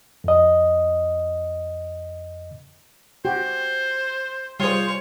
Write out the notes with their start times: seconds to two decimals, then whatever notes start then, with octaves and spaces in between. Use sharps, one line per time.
0.24 F2 D#5
3.25 F#4 G4 C5
4.60 G3 F4 G#4 C5 C#5